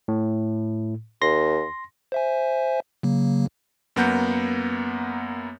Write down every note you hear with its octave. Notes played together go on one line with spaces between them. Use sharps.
A2
D#2 C6 A#6
C5 E5 G#5
C#3 F#3 A#3
F#2 A#3 B3 F#5 G6